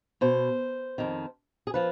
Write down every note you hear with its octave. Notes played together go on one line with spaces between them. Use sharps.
B2 C5
F2 D#3
G#4
F3 B4